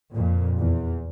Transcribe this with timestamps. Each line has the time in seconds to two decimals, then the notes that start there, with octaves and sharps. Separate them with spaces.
0.14 F2 A#2
0.59 E2